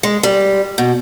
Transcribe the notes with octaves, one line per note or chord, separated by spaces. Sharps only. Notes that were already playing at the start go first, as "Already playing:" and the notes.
G#3
G3
B2